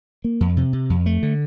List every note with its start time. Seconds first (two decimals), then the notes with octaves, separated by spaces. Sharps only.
0.24 A#3
0.41 F2
0.57 C3
0.73 C3
0.90 F2
1.06 A3
1.23 D3